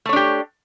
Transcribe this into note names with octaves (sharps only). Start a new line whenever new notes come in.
A3 D4 G4 C#5